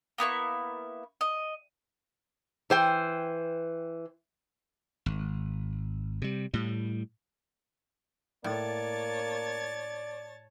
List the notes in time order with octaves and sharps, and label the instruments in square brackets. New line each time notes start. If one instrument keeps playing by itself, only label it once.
[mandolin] A#3 B3 E4 C#6
D#5
[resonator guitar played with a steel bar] E3 C5 G5
[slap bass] G#1
C3 G3
A2 G3
[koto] A2 [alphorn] A#3 [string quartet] C#5 A5 A6 [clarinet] D5